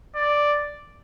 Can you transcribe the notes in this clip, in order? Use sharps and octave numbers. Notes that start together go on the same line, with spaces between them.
D5